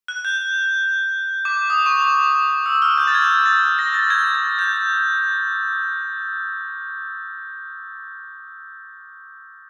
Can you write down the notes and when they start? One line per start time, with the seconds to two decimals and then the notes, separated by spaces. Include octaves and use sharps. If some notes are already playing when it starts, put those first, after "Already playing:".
0.08 F#6
0.25 G6
1.45 D6
1.70 D#6
1.86 C#6
2.02 D6
2.66 E6
2.82 F6
2.98 G6
3.07 A6
3.14 G#6
3.46 A6
3.79 A#6
3.94 A6
4.10 G#6
4.35 G#6
4.59 G6